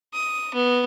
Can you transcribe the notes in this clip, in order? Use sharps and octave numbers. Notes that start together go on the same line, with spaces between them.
D#6
B3